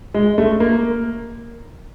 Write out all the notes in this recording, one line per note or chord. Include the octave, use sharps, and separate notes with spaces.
G#3
A3
A#3